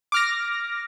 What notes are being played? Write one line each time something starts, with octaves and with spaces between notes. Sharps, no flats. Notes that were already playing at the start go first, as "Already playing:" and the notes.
D6 F6 A#6